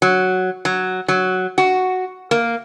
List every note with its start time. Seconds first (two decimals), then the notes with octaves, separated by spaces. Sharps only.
0.02 F#3
0.65 F#3
1.08 F#3
1.58 F#4
2.31 A#3